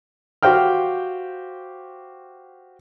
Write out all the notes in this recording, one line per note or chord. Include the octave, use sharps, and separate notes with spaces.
F#4 G4 C5 F5 G5 F6